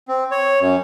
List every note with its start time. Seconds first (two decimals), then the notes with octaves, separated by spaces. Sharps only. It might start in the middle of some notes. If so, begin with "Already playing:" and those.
0.08 C4
0.31 C#5
0.60 F#2